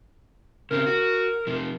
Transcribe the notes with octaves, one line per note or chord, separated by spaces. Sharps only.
C#3 C4 A#4
F#4
C3 F3